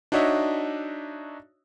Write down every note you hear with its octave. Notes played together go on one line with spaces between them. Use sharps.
D4 D#4 F#4 C#5 D#5 E5